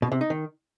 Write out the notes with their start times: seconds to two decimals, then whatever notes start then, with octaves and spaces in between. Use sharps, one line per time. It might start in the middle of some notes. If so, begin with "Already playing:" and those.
0.02 B2
0.12 C3
0.21 D#4
0.30 D#3